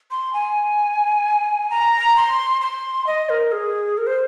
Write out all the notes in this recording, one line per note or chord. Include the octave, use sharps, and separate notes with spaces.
C6
G#5
A#5
C6
C6
D#5
A#4
G#4
A#4
C5